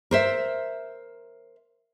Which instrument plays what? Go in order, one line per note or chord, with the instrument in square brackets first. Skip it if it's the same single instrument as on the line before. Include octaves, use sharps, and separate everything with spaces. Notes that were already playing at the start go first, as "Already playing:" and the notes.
[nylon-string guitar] A#4 C5 E5